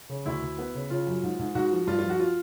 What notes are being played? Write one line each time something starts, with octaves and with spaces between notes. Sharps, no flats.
C#3
D2 E4
D2
B3
C#3
C#3 F4
F#2
G#2
G#2
G#2 F#4
F3
G2 F4
F3 F4
F#4
F4